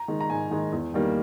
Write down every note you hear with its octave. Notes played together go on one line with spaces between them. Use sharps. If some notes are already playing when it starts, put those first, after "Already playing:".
Already playing: A#5
D#3 G#3
A#5
G#2 G#5
D#3 G#3
E2
D#3 G3 A#3